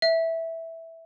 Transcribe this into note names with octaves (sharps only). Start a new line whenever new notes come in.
E5